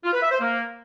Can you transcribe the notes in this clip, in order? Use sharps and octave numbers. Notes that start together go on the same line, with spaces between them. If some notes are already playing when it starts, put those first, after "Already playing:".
F4
B4
E5
C5
A#3